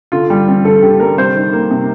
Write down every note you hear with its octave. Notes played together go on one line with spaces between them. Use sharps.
D3 F4
G3
C4
D3 A4
D3 G4
G3 A#4
C3 C5
D#3
A#3
C3